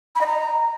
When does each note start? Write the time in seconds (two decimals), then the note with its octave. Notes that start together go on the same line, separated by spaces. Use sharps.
0.15 B5
0.21 D#5
0.26 A#5